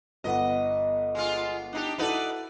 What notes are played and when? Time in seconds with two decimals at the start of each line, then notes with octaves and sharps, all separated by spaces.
0.24 G1 B3 D#5 F#5
1.15 G#3 F4
1.73 D4 D#4 G4
1.98 D#4 E4 F#4 A4 B4 D5